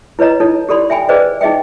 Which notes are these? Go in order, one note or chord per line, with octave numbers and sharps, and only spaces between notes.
E4 B4 C#5 D#5 A#5
D#4 E4 A4 C#5
G4 A4 D5 B5 C6
E5 G5 G#5 B5
G#4 B4 C5 D5 D#5
D#4 G#4 D#5 E5 G5